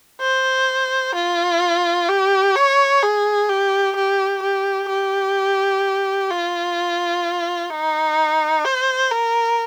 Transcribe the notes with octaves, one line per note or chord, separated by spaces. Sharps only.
C5
F4
G4
C#5
G#4
G4
G4
G4
G4
F4
D#4
C5
A#4